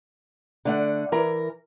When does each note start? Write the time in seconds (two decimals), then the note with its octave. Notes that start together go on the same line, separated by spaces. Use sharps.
0.65 D3 A3 F#5
1.12 E3 A#4